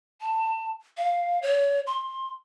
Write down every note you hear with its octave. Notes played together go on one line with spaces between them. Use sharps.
A5
F5
C#5
C6